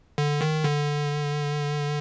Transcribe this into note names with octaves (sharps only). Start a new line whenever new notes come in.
D3
D#3
D3